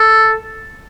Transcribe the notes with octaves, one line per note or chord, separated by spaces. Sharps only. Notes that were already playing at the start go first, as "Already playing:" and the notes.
Already playing: A4